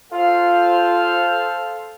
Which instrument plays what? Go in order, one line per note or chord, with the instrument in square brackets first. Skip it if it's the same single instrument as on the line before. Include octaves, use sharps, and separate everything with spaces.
[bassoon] F4 [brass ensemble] A4 C5 F5